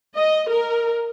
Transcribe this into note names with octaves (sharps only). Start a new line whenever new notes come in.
D#5
A#4